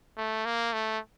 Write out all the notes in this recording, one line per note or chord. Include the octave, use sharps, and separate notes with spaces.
A3
A#3
A3